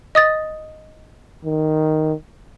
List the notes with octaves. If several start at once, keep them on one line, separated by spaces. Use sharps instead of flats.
D#5 D#6 A6
D#3